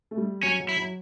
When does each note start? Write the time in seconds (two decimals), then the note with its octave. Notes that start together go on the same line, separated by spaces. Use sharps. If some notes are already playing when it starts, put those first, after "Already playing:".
0.11 A3
0.17 G3
0.43 F#3 C#4
0.60 F#3
0.69 E4
0.77 F#3